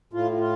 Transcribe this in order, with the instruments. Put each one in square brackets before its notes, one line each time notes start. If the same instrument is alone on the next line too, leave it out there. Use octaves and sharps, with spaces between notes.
[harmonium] A2 F4
F4